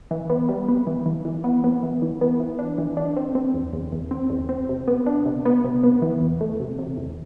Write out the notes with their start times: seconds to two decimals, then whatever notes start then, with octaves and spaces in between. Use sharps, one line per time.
0.11 E3
0.30 B3
0.49 G3
0.68 B3
0.87 E3
1.06 E3
1.25 E3
1.44 B3
1.64 B3
1.83 E3
2.02 E3
2.21 B3
2.40 E3
2.59 D4
2.78 E3
2.97 D4
3.16 C4
3.35 C4
3.54 E2
3.73 E2
3.92 E2
4.11 C4
4.30 E2
4.49 C4
4.69 C3
4.88 B3
5.06 D4
5.26 C3
5.45 B3
5.64 C3
5.84 B3
6.02 E3
6.21 E2
6.41 A3
6.60 C3
6.79 C3
6.97 E2